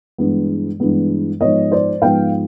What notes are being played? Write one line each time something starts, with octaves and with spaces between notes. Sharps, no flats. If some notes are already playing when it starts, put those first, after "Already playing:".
G2 E3 G#3 B3
G2 E3 G#3 B3
G#2 F3 G#3 B3 C#5 D#5
C5 D5
G#2 F3 G#3 B3 F5 G5